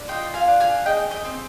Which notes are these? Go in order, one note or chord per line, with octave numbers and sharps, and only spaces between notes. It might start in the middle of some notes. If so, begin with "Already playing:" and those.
Already playing: D4
F4 D#5 G5
F5 G#5
D4
F5 G#5
G#4 D#5 G5
D#5 G5
C4